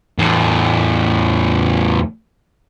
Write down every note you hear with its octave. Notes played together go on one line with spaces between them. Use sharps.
E2 A2